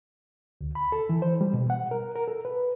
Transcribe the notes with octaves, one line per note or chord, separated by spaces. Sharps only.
D2
B5
A4
E3
C5
G3
B2
F#5
A#4
A#4
A4
B4